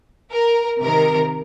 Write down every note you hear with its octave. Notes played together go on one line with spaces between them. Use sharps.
A#4
C3 D#3 A#4